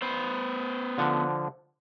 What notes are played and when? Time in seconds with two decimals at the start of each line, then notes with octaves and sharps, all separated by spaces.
0.02 B3 C5
0.98 D3 F3 F#5